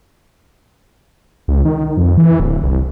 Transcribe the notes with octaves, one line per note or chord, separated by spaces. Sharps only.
C#2
D#3
F2
E3
D1
C2